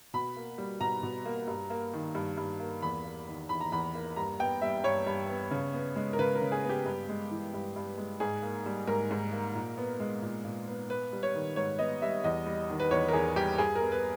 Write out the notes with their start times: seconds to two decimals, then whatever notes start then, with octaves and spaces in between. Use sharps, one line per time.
0.14 B2 B5
0.36 A#3
0.58 G3
0.81 B2 A#5
1.03 B2
1.26 A#3
1.47 G2
1.70 A#3
1.93 D#3
2.15 G2
2.37 G2
2.60 A#3
2.82 E2 B5
3.05 A#3
3.28 D#3
3.49 E2 B5
3.61 A#5
3.72 E2 B5
3.95 A#3
4.16 G2 A#5
4.39 B3 G5
4.62 G3 E5
4.84 G2 C#5
5.07 G2
5.29 B3
5.51 C#3
5.74 B3
5.96 G#3
6.13 A#4
6.19 C#3 B4
6.35 A#4
6.41 C#3
6.52 G#4
6.64 B3
6.69 G4
6.85 G2
7.09 G#3
7.31 E3
7.54 G2
7.76 G2
7.97 G#3
8.20 G#2 G#4
8.43 A#3
8.66 G3
8.87 G#2 A#4
9.11 G#2
9.32 A#3
9.55 A#2
9.78 B3
10.00 G#3
10.22 A#2
10.44 A#2
10.68 B3
10.90 B3 B4
11.13 G3
11.23 C#5
11.34 D#3
11.56 G#2 C#5
11.79 B3 D#5
12.02 G3 E5
12.24 E2 D#5
12.46 G3
12.69 D#3
12.80 B4
12.91 E2 C#5
13.09 A#4
13.13 E2 G#4
13.36 G3 G4
13.58 G2 G#4
13.76 A#4
13.81 B3
13.92 B4